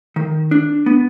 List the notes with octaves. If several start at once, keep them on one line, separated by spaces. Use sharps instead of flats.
D#3
D4
B3